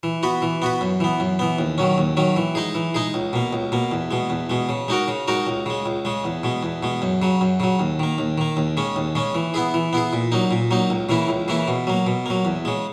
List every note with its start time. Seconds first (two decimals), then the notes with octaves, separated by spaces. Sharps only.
0.03 E3
0.23 B3 F#4 B4
0.42 E3
0.62 B3 F#4 B4
0.81 F#2
1.00 E3 B3
1.20 F#2
1.39 E3 B3
1.59 D#2
1.78 D#3 F#3 C#4
1.98 D#2
2.17 D#3 F#3 C#4
2.36 E3
2.55 G#3 D#4 G#4
2.75 E3
2.94 G#3 D#4 G#4
3.14 C#2
3.33 B2 A#3
3.53 C#2
3.72 B2 A#3
3.91 E2
4.11 B2 G#3
4.30 E2
4.50 B2 G#3
4.69 C#3
4.88 G#3 D#4 F#4 A#4
5.08 C#3
5.28 G#3 D#4 F#4 A#4
5.47 C#2
5.66 C#3 G#3
5.86 C#2
6.05 C#3 G#3
6.24 E2
6.44 B2 G#3
6.63 E2
6.83 B2 G#3
7.02 F#2
7.22 C#3 F#3
7.41 F#2
7.60 C#3 F#3
7.80 D#2
8.00 D#3 A#3
8.18 D#2
8.38 D#3 A#3
8.57 D#2
8.77 C#3 G#3 C#4
8.96 D#2
9.15 C#3 G#3 C#4
9.35 E3
9.54 B3 E4 G#4
9.74 E3
9.93 B3 E4 G#4
10.13 A#2
10.32 F#3 A#3 D#4
10.51 A#2
10.71 F#3 A#3 D#4
10.90 C#2
11.09 C#3 E3 A#3 E4
11.28 C#2
11.48 C#3 E3 A#3 E4
11.68 B2
11.87 F#3 A#3
12.07 B2
12.26 F#3 A#3
12.45 E2
12.65 C#3 G#3